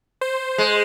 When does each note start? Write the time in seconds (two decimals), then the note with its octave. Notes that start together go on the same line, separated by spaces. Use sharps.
0.21 C5
0.58 G#3